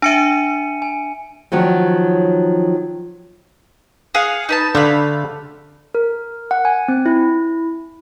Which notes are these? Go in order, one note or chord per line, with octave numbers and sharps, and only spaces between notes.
D4 E5 G#5 C#7 D#7
G#5
D#3 F3 F#3 C#4
G#4 F5 F#5
D#4 B4 A5
D3 A3 F5 B5
A#4
F#5
G#5
C4
E4